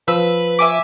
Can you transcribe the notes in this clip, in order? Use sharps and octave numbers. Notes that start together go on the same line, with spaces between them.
F3 B4 E6
E5 G#5 D6